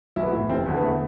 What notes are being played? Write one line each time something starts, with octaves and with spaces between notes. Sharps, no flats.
B1 E4
B3
A3
A2 E3
F1 C4
E2 D3
B3
A3